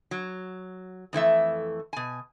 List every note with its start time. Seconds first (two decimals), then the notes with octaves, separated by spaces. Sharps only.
0.11 F#3
1.13 F2 E3 A3 E5
1.93 B2 G#5